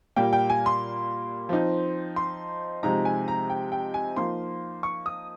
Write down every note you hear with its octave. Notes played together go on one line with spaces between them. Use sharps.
A#2 G3 A#3 G5
G5
G#5
C6
F3 C4 D#4
C6
C3 F3 G#3 D#4 A#5
G#5
A#5
G5
G5
G#5
F3 A#3 D#4 C6
C#6
D#6